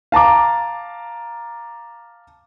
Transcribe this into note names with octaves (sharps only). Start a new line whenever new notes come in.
F5 A5 A#5 D6